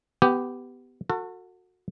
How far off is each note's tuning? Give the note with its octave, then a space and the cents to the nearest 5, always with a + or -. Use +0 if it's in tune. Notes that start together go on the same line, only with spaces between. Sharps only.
B3 +15 G4 -5
F#4 -20 A4 +35